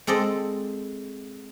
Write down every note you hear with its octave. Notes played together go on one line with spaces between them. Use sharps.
G#3 C4 A4 D5 D#5